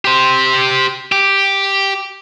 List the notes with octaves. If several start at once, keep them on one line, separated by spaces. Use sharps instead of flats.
G4 C5
G4